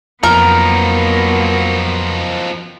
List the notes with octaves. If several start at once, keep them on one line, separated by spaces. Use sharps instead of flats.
F2 F3 F#3 A#3 B3 D#4 A#4